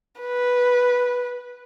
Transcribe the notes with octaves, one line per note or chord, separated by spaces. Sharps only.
B4